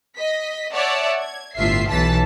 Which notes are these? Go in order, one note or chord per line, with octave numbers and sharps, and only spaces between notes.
D#5 B6
C#5 D5 E5 F#5 A5
G#6
G1 A2 F4 E5 C7
B1 E3 A5 B6